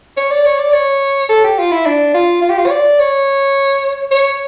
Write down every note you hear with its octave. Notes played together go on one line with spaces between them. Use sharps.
C#5
D5
C#5
D5
C#5
A4
G4
F4
E4
D4
F4
F4
G4
F4
C#5
D5
C#5
C#5